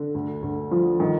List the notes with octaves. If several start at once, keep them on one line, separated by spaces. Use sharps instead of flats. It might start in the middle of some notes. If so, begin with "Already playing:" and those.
Already playing: D3
D2
D2
F3
D#3